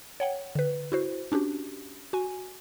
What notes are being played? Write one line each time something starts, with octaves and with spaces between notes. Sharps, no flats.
C#5 F#5 G5
D3 B4
E4 F#4 C5
C#4 D4 F#4 G4
F#4 G#5